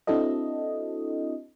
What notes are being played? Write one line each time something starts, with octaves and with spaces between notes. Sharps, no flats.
C4 D4 E4 F#4 A4 D#5